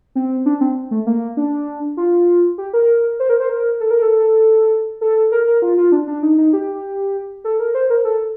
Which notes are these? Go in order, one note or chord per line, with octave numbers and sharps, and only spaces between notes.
C4
D4
C4
A3
A#3
D4
F4
G4
A#4
C5
A#4
C5
A#4
A4
A#4
A4
A4
A#4
A#4
F4
F4
D4
D4
D#4
D#4
G4
A4
A#4
C5
A#4
A4